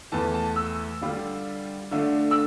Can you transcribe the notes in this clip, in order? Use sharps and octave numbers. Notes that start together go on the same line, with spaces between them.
E2 E3 A3 A5
A5
E6
D3 G3 D4 F4
D3 A3 D4 F4
E6